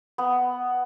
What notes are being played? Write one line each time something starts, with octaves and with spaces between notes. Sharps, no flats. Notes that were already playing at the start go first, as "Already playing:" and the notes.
B3